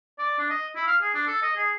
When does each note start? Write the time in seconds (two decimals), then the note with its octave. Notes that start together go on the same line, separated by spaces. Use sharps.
0.19 D5
0.38 D4
0.50 D#5
0.76 E4
0.87 F5
1.01 G#4
1.14 D4
1.27 A4
1.42 D#5
1.56 G#4